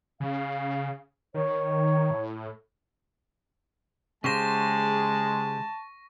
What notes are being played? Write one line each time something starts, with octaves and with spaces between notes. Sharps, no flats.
C#3 F5
D#3 C#5
A2
C#3 G#3 G4 C5 A5 C#6 A#6